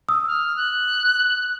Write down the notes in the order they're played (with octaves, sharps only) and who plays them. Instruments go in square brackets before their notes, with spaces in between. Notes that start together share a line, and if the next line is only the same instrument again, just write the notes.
[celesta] D#6 E6
[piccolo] F6
F#6